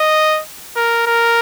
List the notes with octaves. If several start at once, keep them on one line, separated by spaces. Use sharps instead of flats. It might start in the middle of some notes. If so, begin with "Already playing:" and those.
Already playing: D#5
A#4
A#4